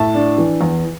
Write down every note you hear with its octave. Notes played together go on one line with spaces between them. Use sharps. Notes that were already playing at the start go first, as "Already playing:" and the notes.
Already playing: A2 E5 A5
D4
E3
E2